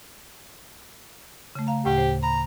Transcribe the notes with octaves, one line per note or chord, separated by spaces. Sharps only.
C#3 A3
F5 A#5
D2 A2 C#3 G4
C5
A#5 B5